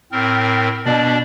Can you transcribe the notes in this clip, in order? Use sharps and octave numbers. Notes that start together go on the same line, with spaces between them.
A2 C4 A#4
B2 D4 D5